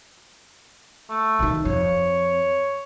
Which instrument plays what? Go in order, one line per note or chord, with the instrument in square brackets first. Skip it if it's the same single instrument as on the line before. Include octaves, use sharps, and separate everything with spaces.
[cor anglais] A3
[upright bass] D#3 E3
[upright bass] F2 [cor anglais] C#5